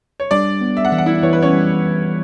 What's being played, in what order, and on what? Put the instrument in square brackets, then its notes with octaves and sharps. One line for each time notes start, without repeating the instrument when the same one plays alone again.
[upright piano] C#5
[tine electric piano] G3 [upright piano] D4 D5
[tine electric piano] B3
[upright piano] E5
F#5
[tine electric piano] E3 [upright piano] E5
[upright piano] F#5
E4 E5
[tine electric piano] E3 [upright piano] C#5
[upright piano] B4
C#4 C#5
[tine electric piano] G3